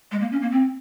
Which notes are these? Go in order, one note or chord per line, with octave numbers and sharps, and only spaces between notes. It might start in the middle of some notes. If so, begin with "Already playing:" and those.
G#3
A#3
C#4
A#3
C4